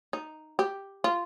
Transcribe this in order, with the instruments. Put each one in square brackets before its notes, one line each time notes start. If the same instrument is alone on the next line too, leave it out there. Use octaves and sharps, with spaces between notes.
[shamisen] D#4
G4
F4